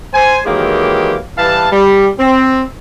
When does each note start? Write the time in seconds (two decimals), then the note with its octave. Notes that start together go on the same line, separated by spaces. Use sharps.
0.14 C5 G#5
0.45 D#3 E3 F#3 G#3 A#3 G4
1.38 E3 G3 B4 F5 A5
1.72 G3
2.18 C4